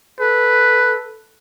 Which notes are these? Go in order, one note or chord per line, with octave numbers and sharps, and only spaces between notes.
A4 B4